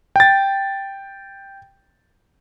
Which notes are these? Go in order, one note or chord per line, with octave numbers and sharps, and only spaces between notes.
G5 A6